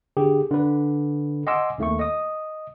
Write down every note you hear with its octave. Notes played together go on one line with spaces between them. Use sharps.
D3 G4 G#4
D3 B4
D#5 F#5 G#5 C6 D6 E6
D#2 D#3 A3 A#3 C#6
D#5 D#6